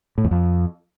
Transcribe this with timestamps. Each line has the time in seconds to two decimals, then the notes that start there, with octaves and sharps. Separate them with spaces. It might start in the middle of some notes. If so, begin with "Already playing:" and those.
0.18 A2
0.24 E2
0.31 F2